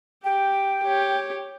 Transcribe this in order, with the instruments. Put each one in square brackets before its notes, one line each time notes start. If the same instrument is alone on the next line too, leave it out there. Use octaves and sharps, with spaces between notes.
[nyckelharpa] G4 [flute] G5
[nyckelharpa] G4 C#5